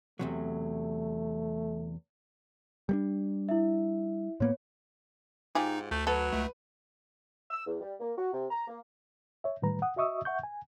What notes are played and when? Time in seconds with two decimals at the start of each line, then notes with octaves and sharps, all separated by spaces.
0.19 E2 C3 F#3 A3
2.89 G3 A3 D4
3.49 E4 E5
4.40 A2 A#3 B3 C#5
5.55 G#2 D#4 F4 G4 G#4
5.91 D2 A3
6.07 F#3 A4 B4
6.33 C#2 A3
7.51 E6
7.66 E2
7.80 G3
8.00 A#3
8.16 F#4
8.31 C3
8.50 A#5
8.67 A#3
9.44 C#5 E5
9.62 A2 D#3 G3 B4 A#5
9.82 F#5 D#6
9.96 F#4 D#5 E5 C#6 D#6 E6
10.25 E5 F#5 C#6 G6
10.43 G#5